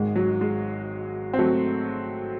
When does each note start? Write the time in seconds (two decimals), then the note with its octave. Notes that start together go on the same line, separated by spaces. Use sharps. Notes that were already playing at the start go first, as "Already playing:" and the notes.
Already playing: G#1 G#2 D#3 G#3
0.16 F#3
0.41 G#3
1.33 C4
1.39 F#3 A3